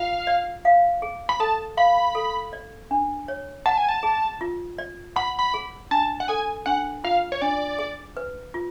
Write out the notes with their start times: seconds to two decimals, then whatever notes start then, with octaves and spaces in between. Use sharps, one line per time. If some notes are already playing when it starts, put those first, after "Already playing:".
Already playing: F4 F5
0.27 D5
0.65 F5
1.02 G#4
1.29 B5
1.40 A4 A5
1.77 F5 B5
2.15 A4
2.53 D5
2.91 D4
3.28 C#5
3.66 F#5 A5
3.77 G#5
3.89 A5
4.03 G#4
4.41 F4
4.78 D5
5.16 F#5 B5
5.39 B5
5.54 G#4
5.91 D4 A5
6.20 F#5
6.28 A4 G#5
6.66 D4 F#5
7.04 F4 F5
7.32 C#5
7.41 D4 D5
7.79 G#4
8.17 B4
8.54 F4